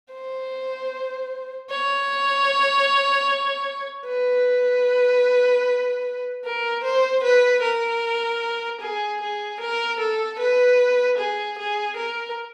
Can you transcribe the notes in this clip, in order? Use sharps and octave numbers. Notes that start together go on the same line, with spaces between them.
C5
C#5
B4
A#4
C5
B4
A#4
G#4
G#4
A#4
A4
B4
G#4
G#4
A#4